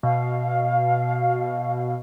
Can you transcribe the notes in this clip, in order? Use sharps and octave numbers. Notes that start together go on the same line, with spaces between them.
B2 F5